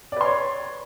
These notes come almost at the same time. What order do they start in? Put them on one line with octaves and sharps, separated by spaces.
D5 B4 C6 C#5